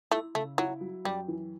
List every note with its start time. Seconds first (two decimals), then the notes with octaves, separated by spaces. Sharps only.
0.12 A3 E4
0.35 C#3 A3
0.58 F#3 E4
0.81 F#3
1.05 F#2 G3
1.28 E3